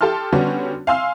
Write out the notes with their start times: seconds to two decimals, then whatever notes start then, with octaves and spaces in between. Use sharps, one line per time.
0.01 G4 A4 A5 C6 F6
0.32 D3 G3 B3 C#4 D4 F#4
0.87 F5 G#5 C6 E6 F6